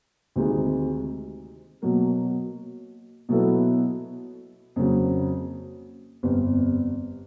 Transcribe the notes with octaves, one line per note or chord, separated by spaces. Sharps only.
D2 C3 D#3 G#3
B2 F#3 A#3
B2 F#3 B3 E4 A4
F2 C#3 F#3 A#3
G1 F2 C3